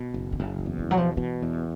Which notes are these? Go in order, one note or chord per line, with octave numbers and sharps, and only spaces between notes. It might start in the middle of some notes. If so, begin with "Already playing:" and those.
Already playing: B2
F#1
D3
F#1 C#3
D3
E2
D#3
B2 F#3
F3
B2 E3
E2